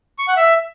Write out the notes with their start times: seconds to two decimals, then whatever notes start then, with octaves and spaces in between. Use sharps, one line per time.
0.19 C#6
0.28 F#5
0.37 E5